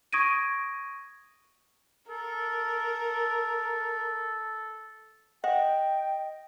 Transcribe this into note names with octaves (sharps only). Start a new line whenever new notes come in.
C#6 D#6 G#6 A#6 D7 D#7
A4 A#4
D#5 F#5 G5